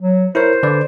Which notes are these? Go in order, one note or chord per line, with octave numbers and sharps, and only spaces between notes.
F#3
E4 A#4 C5 C#5
D3 B4 D5